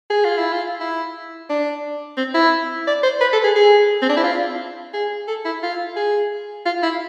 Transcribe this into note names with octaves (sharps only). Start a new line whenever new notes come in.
G#4
F4
E4
F4
E4
D4
C4
E4
D5
C5
B4
A4
G#4
G#4
C4
D4
E4
F4
G#4
A4
E4
F4
G#4
F4
E4